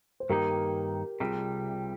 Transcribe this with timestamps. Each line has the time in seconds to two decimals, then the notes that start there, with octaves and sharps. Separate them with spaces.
0.20 C5
0.29 G2 D#3 A#3 D#4 G4 A#4
1.20 C2 C3 G3 F4 G#4